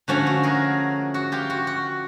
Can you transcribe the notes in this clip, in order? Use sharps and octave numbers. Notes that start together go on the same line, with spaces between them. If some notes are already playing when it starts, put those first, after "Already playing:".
D3 F3 A3 C#4 F#4
F#4
G#4 A#4
F#4
F4 G4
F#4
F#4